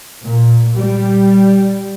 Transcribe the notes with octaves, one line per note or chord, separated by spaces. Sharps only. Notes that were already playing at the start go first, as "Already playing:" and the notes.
A#2
G3